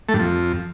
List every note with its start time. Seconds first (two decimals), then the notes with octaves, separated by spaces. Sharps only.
0.09 A3
0.14 G2
0.19 F2